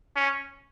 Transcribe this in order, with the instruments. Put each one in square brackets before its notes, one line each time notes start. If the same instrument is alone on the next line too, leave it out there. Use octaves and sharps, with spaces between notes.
[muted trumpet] C#4